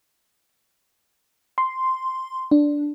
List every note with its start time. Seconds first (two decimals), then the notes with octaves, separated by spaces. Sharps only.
1.58 C6
2.51 D4